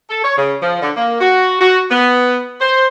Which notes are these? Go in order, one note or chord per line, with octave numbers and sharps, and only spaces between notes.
A4
C#5
C#3
F3
D3
A#3
F#4
F#4
B3
C5